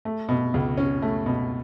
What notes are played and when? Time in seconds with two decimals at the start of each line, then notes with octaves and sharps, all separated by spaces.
0.05 A3
0.29 B2
0.54 C#2
0.77 C#4
1.02 A3
1.26 B2